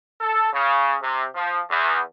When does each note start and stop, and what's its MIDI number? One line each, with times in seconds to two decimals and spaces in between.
0.20 0.50 69
0.52 0.95 49
1.02 1.24 48
1.35 1.59 53
1.70 1.99 40